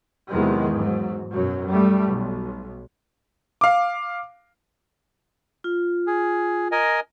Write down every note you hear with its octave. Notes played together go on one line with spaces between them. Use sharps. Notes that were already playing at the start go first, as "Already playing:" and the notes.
E2 C3 D#3 F#3 G#3
G#2 F#3
F#2 B2 F#3
G3 A3
B1
F5 D6
F4
G#4
A#4 D#5 G#5